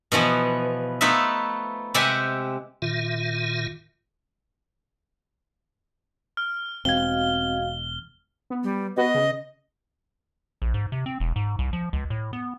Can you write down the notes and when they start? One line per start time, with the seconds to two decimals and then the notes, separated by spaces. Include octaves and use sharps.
0.12 B2 E3 F3 B3
1.01 A3 B3 D#4 F4 B4 E5
1.94 C3 G#3 G4 E5 F#5 G#5
2.82 A#2 D#3 F4 E5
6.37 F6
6.85 E1 C4 F#4 D#5 F5 G#6 G7
8.50 B3
8.64 G3
8.97 B3 F#4 B4 D#5
9.14 C#3
10.62 A#1
10.74 G#2
10.92 C3
11.06 C4
11.20 E1
11.36 G#2
11.59 C2
11.73 F3
11.93 C#2
12.10 A2
12.33 B3